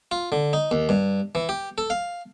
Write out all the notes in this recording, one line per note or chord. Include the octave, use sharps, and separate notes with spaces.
F4
D3
D#4
D#2
G2
E3
G4
A4
F5